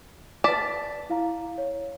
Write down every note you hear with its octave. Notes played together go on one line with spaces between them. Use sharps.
B4 D5 A5 A6 B6
E4 F5 A#5
C#5